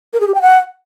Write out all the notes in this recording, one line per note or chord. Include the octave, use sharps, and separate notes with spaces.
A#4
G#4
G4
G5
F#5